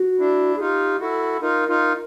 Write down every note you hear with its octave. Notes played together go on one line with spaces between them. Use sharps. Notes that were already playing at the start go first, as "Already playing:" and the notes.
Already playing: F#4
D4 E4
G#4
D#4 F4 G4
E4 F#4 A4
D#4 F4 A#4
D#4 F4